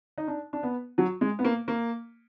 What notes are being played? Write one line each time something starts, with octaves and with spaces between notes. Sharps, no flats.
D#4
D4
D4
B3
F#3
G#3
B3
A#3
A#3